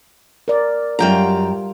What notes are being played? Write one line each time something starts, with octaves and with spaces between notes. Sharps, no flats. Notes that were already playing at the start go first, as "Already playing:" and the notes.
A#4 D5
F#2 G3 F4 A4 G5 A#5